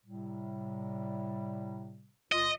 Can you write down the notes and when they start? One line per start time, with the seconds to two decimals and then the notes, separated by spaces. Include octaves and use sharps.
0.05 A2 C3 G3
2.32 C#2 A#2 F4 D#5